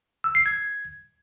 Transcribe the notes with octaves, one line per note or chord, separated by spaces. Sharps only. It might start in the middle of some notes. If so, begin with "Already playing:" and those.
E6
C7
G#6